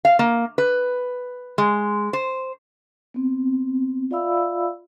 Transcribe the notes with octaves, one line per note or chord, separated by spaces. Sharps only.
F5
A#3
B4
G#3
C5
B3 C4
F4 D5 E5 F5 B5 E6